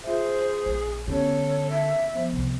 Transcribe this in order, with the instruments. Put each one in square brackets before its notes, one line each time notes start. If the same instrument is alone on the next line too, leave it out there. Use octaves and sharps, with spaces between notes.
[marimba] F4 E5 [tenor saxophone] G#4 [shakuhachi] C5
[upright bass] A#1
[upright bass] D3 [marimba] B3 C#4 G4 [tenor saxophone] A4 [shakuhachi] C#5
[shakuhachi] E5
[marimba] F3 B3 C5
[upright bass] C2 C3